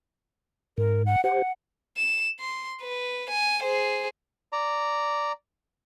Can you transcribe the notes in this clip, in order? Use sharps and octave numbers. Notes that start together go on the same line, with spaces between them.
G#2 A#4
F#5
G4 C5 F#5
E7
C6
B4
G#5
G#4 C5
D5 A#5